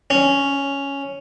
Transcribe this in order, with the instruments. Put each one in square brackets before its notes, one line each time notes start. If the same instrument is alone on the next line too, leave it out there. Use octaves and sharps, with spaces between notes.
[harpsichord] C#4